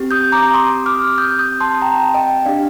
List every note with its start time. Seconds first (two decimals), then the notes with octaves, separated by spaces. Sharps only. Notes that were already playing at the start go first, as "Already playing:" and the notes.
Already playing: C4 G4
0.11 D#6 G6
0.32 A#5 D6
0.54 C6 D#6
0.86 D6 F6
1.18 D#6 G6
1.39 D#6 G6
1.60 A5 C6
1.75 A5
1.81 G5 A#5
2.14 D#5 G5
2.45 D4 G4 D5 F5